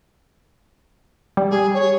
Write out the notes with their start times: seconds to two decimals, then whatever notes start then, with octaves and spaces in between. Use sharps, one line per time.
1.37 G3
1.51 G#4
1.74 C#5